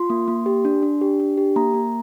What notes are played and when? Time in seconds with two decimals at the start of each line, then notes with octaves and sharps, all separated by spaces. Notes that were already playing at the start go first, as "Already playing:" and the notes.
Already playing: F4 C6
0.10 A#3
0.28 A#3
0.46 G4
0.65 D4
0.83 D4
1.01 G4
1.20 D4
1.37 G4
1.56 A#3 A#5
1.74 A#3